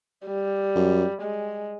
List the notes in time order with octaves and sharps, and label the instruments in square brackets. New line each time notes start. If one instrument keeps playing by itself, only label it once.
[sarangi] G3
[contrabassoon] F#2
[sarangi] G#3